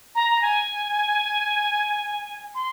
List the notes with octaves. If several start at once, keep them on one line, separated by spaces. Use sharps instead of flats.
A#5
A#5
G#5
C6